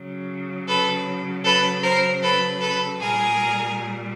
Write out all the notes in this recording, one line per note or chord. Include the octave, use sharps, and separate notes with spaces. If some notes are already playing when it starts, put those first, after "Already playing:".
Already playing: C#3 F#3
A4 B4
A4 B4
A#4 C5
A4 B4
A4 B4
A#2 G3 G#4 A#4